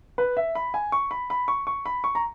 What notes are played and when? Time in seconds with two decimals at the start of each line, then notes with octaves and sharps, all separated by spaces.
0.18 B4
0.37 E5
0.55 B5
0.74 G#5
0.92 C#6
1.11 B5
1.30 B5
1.48 C#6
1.67 C#6
1.86 B5
2.04 C#6
2.15 A#5